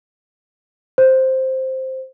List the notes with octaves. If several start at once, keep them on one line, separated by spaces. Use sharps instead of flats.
C5